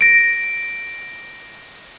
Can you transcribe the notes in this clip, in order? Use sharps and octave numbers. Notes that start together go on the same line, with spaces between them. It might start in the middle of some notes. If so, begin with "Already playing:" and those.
A#6 D7